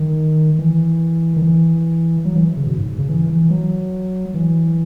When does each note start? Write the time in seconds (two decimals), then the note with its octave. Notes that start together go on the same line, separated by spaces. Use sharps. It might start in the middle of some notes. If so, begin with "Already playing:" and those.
Already playing: D#3
0.59 E3
1.36 D#3
1.42 E3
2.25 F#3
2.36 E3
2.57 C#3
2.67 B2
2.78 G#2
2.99 C#3
3.09 E3
3.29 E3
3.50 F#3
4.34 E3